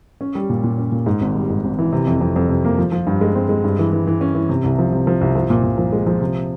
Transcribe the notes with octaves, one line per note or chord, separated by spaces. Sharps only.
C#4
G3
A#2
A#2
C#4
A#2
G#2
G#1
G3
G#2
G#1
E3
C3
F2
F2
F2
C3
A#3
F3
F3
G2
G#3
C4
G#3
G2
E3
E3
E3
C#4
E3
C3
C2
F3
C3
F3
C2
F3
A#2
A#2
F3
G#3
F3
C3